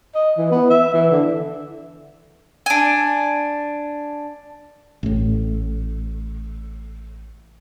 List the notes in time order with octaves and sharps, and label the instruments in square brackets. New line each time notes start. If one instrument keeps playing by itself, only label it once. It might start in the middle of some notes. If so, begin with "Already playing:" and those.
[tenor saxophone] D#5
E3
B3
E5
E3
D3
[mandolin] D4 G#5
[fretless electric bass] A1 A2